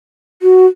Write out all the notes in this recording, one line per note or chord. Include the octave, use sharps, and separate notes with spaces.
F#4